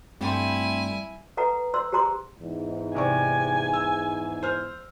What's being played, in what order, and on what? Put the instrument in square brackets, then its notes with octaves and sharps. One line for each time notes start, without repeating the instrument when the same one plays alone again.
[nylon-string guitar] G2 A3 [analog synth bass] G3 [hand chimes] C4 G5 C6 [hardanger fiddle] E4 G#5
[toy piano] A4 B4 F#5 A#5
C5 C6 E6
G4 G#4 C5 A#5 C6 D6
[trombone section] E2 G#2
[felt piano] C3 D5 C#6 [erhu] G#5
[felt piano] E6
C5 F6